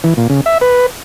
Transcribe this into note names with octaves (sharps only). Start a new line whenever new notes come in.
E3
A#2
C#3
E5
B4